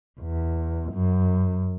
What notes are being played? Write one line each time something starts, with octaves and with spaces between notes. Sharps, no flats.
E2
F#2